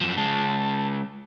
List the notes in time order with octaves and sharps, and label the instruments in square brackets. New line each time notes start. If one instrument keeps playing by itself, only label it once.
[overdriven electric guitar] F#2 F3 [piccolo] E7
[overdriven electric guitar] C#3 G#3 [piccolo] A5